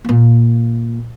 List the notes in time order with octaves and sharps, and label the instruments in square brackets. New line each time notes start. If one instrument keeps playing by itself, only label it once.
[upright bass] A#2 A#3